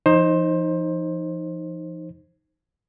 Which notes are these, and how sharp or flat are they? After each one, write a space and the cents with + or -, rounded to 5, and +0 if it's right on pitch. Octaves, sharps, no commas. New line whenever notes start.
F3 -45 D#4 +0 C5 +20